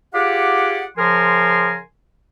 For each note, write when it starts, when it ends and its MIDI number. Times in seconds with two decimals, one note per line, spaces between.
0.13 0.84 65
0.13 0.84 67
0.13 0.84 68
0.13 0.84 74
0.13 0.84 78
0.97 1.78 49
0.97 1.78 53
0.97 1.78 70
0.97 1.78 80
0.97 1.78 84